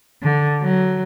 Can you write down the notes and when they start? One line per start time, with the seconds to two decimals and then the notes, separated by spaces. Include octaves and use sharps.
0.22 D3
0.62 F#3